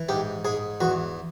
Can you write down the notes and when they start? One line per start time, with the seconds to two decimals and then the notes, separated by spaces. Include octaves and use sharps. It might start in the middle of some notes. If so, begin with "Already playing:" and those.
Already playing: E3
0.09 G#2 G4
0.45 G#2 G#4
0.80 E2 F#4